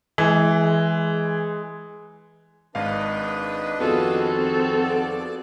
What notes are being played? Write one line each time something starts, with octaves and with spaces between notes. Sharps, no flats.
E3 G#3
G#1 G#2 D4 B4 D#5 F5
F2 D#3 B3 C4 F4 F#4 G#4 A4
D5